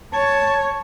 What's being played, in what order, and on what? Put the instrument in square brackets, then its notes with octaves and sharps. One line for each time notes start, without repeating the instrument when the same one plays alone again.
[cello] C#5 [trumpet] A5